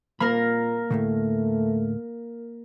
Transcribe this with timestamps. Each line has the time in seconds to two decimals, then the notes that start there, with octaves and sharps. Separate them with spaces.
0.20 A#2 A#3 A#4 B5
0.90 D2 A2 C#3 A3